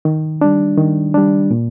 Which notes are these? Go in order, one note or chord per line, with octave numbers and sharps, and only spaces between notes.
D#3
G3 D4
D#3
G3 D4
A#2